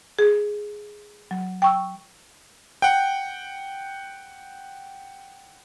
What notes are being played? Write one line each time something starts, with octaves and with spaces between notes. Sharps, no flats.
G#4
F#3
G5 C#6 E6
F#5 G5